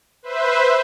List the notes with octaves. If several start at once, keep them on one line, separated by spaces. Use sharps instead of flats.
B4 C5 E5